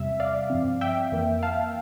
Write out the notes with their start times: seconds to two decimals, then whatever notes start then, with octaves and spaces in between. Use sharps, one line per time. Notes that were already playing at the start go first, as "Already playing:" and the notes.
Already playing: E2 C3 G3 E5
0.20 D5 F5
0.50 G2 F3 C4
0.81 E5 G5
1.12 F2 E3 A#3
1.43 F5 A5